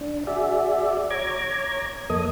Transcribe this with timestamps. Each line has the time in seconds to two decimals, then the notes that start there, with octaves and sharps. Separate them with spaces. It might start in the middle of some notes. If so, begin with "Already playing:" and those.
0.01 D4
0.27 F#4 G#4 D5 E5
1.11 C#5 A#5 D6 G#6
2.10 F2 A#3 A4 D#5 D#6